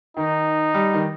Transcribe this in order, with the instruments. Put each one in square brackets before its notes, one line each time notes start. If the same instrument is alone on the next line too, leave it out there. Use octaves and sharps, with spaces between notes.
[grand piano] D#3 [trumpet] D#4
[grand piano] G3
D#3